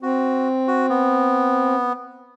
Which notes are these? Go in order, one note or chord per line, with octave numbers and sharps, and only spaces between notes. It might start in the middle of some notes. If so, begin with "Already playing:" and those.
C4 F#4
F#4
B3